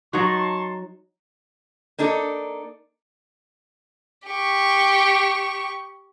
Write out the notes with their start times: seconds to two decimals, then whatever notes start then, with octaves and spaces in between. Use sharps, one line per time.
0.13 F#3 D#4 F#4 A5 C6 C#6
1.99 A#3 D4 D#4 A4
4.28 G4 C#6